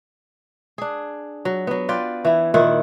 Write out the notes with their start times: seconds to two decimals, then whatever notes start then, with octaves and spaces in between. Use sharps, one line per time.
0.78 D4 G#4
1.45 F#3
1.67 F#3 B3
1.89 F4 B4 D5 G5
2.25 E3 E4
2.54 A#2 D#3 E4 F#5